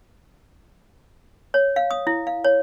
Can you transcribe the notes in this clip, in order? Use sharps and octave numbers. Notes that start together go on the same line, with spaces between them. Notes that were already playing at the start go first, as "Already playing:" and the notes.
C#5
F5
D#6
E4
F5
C#5